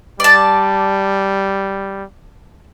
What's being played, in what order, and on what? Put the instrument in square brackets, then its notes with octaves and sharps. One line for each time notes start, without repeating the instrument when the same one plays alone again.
[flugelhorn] G3 [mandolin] D5 A5